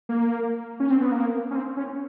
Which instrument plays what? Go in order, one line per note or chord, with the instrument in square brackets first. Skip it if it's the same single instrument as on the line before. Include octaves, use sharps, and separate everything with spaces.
[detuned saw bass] A#3
C#4
C4
B3
A#3
C#4
C4
C#4